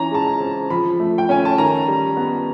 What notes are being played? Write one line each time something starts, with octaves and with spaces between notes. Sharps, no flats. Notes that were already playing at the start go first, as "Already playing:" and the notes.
Already playing: E3 C#4 A#5
G#3 A5
A#5
C4
F3 B5
A3
G5
C#4 G#5
A5
D#3 A#5
G3
B3